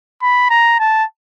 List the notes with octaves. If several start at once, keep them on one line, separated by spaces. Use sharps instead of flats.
B5
A#5
A5